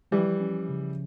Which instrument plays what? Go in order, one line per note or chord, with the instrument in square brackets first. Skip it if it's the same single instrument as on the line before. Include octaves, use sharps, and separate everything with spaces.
[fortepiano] E3 G3 [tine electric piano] F3
[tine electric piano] C#4
C#3